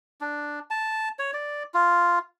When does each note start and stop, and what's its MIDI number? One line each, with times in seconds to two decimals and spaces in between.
0.21 0.59 62
0.71 1.09 81
1.19 1.31 73
1.33 1.63 74
1.74 2.19 65